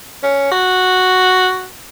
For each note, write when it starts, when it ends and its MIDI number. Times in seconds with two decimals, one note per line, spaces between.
0.23 0.47 61
0.52 1.68 66